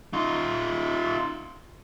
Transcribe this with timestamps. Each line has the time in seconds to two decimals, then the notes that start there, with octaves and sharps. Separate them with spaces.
0.13 D#4 F4